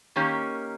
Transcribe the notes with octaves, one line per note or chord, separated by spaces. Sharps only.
D#3 A#3 C#4 G4 C#5